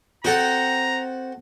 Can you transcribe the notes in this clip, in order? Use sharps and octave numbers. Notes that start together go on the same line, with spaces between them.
C4 F#4 A4 F#5 G5 A#5